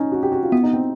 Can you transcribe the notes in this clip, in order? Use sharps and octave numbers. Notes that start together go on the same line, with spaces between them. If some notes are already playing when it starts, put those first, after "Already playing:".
Already playing: C#4 D#4
F#4
G4
F#4
F4
B3 E4
D#4
C4